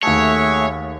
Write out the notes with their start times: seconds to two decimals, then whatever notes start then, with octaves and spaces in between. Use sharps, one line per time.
0.03 D#2 A3 F#4 G#4 C#5 E5 A5